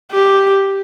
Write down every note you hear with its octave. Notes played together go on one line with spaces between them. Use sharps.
G4